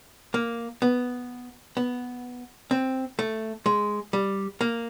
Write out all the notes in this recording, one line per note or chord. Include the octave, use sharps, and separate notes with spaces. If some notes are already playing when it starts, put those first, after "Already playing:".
A#3
B3
B3
C4
A3
G#3
G3
A#3